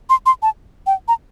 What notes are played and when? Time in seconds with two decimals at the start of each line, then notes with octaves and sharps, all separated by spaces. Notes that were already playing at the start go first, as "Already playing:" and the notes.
0.10 C6
0.26 C6
0.42 A5
0.87 G5
1.08 A#5